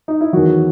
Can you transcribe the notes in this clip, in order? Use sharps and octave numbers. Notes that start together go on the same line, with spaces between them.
D#4
E4
E2 D#3 F#3 F#4